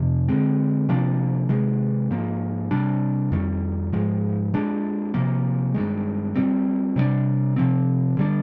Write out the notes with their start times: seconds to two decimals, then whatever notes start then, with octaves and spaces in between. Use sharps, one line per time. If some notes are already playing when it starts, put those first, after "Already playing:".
Already playing: F2 C3 F3
0.28 D3 G#3 C4
0.89 C3 F3 A#3 D4
1.49 C3 D#3 G#3
2.10 G#2 F3 A#3
2.71 C3 G3 D4
3.32 F2 D#3 G3
3.93 G#2 F3 G#3
4.54 A#2 G#3 D4
5.14 C3 F3 A#3
5.74 G2 D#3 G#3
6.36 A#2 G3 C4
6.96 C3 G3 A#3 D4
7.56 C3 F3 C4
8.17 D3 G3 D4